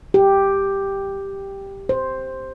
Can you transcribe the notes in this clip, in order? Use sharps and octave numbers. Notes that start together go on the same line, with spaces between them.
G4
C5